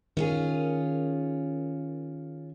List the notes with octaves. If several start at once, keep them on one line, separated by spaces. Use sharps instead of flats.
D#3 C#4 F4 G#4